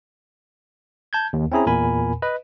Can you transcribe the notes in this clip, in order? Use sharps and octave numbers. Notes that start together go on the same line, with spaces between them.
A5 G6 G#6
D#2
C4 C#4 E4 G#4 A#5
E2 A#2 A#4 G#5 B5
B4 D#5